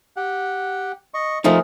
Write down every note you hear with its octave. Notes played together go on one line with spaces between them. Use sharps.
G4 F#5
D#5 C#6
F3 A3 D#4 G#4 A#4